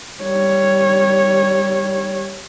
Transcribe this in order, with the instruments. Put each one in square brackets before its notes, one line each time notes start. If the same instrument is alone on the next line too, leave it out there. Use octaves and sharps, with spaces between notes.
[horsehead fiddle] G3 C#5